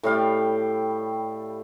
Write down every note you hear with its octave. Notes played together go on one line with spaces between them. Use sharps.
A2 G3 F5 G5